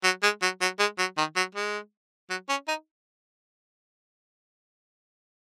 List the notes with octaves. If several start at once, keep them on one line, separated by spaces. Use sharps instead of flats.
F#3
G#3
F#3
F#3
G#3
F#3
D#3
F#3
G#3
F#3
C#4
D#4